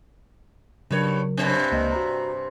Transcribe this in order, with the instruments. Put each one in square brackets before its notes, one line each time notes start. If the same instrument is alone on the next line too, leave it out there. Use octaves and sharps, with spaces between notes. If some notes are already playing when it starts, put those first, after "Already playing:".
[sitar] G2 C#5 [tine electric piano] C#3 F#3 A#4
[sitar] G2 C3 C4
[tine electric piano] C#2 A#3 D#5
F#4 A#5